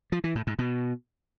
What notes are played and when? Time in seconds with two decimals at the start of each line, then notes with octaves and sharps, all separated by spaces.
0.12 F3
0.24 E3
0.35 A2
0.47 G#2
0.59 B2